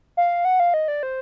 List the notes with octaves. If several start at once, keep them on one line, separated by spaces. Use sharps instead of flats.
F5
F#5
F5
D#5
D5
C5